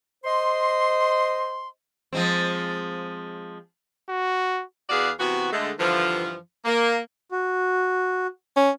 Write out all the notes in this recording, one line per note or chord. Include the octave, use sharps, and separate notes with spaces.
C5 D#5 C6
F3 G#3 C4
F#4
E2 F#4 G#4 B4 D5 F5
C3 E3 B3 F#4
D3 G#3 A3
G2 D3 E3 F3
A#3
F#4
C#4